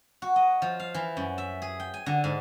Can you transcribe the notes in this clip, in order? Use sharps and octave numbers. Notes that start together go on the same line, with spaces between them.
F#4
D#5
F3
F5
E3
F#2
E5
G#4
G5
G#5
D3
G#2